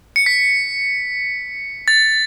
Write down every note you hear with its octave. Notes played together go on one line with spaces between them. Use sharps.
C#7
B6
A6